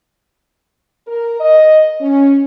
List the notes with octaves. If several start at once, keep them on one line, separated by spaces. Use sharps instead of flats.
A#4
D#5
C#4